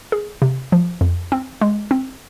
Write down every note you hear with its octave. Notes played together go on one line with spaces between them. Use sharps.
G#4
C3
F3
F2
C4
G#3
C4